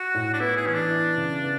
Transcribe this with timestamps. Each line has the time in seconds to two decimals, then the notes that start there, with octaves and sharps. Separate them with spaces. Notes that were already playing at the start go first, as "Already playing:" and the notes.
Already playing: F#4
0.15 A2
0.33 D4
0.40 B3 E4
0.57 G#4
0.66 E3 C#4
0.74 D4
0.90 E4
1.17 C#3
1.42 B3